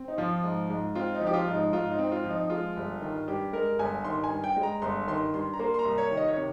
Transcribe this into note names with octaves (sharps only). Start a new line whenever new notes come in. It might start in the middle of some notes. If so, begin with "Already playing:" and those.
Already playing: C4
D#4
F3 F4
G#2
G#2
C4 F4
D#4
F3
G4
F4
G#2
D#4
G#2 F4
D#4
C4
F4
F3
D#4
G#3 F4
G1
D#3
G2 G4
G#3 A#4
G1 G#5
D#3 C6
G#5
G2
G5
G#3
A#5
G1 C6
D#3 C6
G2 C6
A#5
A#3 C6
C6
A#5
C2
C#5
D#3
D#5
C#5
C3